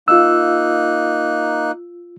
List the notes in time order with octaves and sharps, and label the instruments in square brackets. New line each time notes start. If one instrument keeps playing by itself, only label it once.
[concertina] A#3 D#4 F#6 [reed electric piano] F4 E6